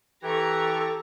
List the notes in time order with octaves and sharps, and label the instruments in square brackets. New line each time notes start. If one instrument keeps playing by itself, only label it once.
[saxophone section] E3 [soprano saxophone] G4 [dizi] A4 [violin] A#5 C#6